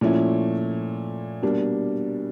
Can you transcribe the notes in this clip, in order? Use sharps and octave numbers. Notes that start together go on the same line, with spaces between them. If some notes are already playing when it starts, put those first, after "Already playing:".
A#2 F3 A3 C#4 E4
B2 G3 A#3 D4